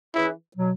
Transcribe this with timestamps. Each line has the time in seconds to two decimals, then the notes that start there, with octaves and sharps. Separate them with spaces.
0.14 E3 C#4 E4 G#4 B4
0.56 B2 F#3